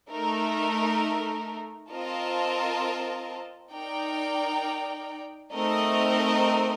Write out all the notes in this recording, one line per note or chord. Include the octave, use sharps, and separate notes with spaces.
A3 D#4 A#4
C4 F4 A#4 D#5 A5
D#4 A#4 D5 G5
A3 C4 D#4 A#4 D#5